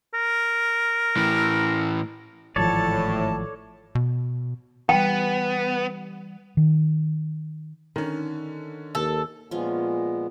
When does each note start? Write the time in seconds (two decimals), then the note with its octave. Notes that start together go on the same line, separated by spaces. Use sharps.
0.14 A#4
1.17 A2 E3
2.56 G#1 A2 E3 F3 A4 C#5 D5 A5
3.95 B2
4.89 E3 G3 B3 G5
6.57 D#3
7.96 D3 D#3 C#4
8.95 D#2 A4
9.51 A#2 F3 G#3 B3 C#4 F4